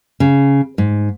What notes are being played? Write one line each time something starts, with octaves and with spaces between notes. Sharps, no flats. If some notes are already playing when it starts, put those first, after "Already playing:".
C#3
G#2